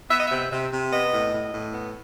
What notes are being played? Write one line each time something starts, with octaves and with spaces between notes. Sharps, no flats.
B3 E5
D#5
C3 E5
C3
C3
B3 D#5
A2
A2
A2
B3